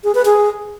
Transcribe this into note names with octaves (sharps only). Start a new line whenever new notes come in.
G#4
B4
G#4